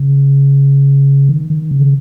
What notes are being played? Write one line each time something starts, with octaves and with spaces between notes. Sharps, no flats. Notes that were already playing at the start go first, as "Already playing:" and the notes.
Already playing: C#3
D#3
D#3
C#3